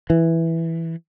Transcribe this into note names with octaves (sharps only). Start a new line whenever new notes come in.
E3